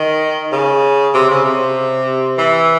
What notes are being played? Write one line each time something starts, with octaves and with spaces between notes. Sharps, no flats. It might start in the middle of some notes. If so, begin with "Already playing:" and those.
Already playing: D#3
C#3
C3
C#3
C3
E3